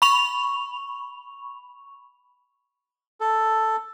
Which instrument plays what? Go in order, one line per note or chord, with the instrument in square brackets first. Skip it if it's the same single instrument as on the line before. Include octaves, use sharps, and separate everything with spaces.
[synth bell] B5 C#6 F7
[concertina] A4